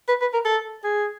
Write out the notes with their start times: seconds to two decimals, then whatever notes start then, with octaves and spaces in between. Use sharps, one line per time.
0.08 B4
0.21 B4
0.34 A#4
0.45 A4
0.84 G#4